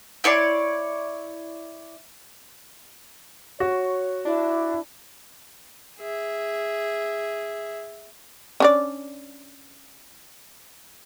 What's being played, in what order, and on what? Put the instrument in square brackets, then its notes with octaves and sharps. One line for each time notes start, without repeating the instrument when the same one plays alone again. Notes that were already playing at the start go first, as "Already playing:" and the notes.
[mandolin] E4 C#5 D5 C6
[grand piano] F#4 [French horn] C#5
[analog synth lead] D4 [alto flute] E4
[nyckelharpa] G#4 E5
[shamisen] C#4 D4 D5